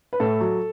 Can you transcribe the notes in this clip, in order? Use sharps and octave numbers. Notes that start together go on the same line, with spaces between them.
B4
A2 A4
F#3